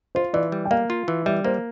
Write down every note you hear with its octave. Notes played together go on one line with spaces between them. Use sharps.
F4 C5
E3 D5
G3
G5
A#3 F5
F4
E3
G3 E5
A#3 C5